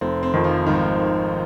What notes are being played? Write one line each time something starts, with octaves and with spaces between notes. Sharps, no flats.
F1 C4
C4
F2 D#3
F3
G#1 D#3
F3